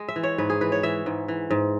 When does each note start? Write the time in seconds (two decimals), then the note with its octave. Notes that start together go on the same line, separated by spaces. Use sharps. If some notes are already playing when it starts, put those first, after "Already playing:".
Already playing: G#3
0.09 E5
0.16 E3
0.23 C#5
0.38 G#2 B4
0.50 G#4
0.61 E3 B4
0.72 C#5
0.83 E3 E5
1.06 G#2
1.28 E3
1.51 G#2